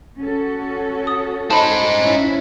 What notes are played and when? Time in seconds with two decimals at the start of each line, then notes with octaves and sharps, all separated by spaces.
0.20 C#4 F#4 A4
1.07 D#6
1.50 D#4 C5 A5 B5
2.01 C#4 E4